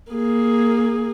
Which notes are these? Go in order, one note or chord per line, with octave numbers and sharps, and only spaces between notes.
A#3 G#4